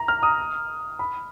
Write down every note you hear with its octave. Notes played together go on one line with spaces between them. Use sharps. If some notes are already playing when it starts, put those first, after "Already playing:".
Already playing: A#5
F6
D#6
B5